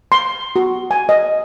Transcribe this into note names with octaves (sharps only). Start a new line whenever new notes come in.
C6
F#4
G#5
D#5